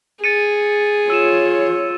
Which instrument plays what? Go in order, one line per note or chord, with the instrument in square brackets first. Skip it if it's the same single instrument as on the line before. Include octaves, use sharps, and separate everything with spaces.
[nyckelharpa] G#4 [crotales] A6 C#7 D#7
[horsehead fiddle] F4 C#5 [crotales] E6 D#7 E7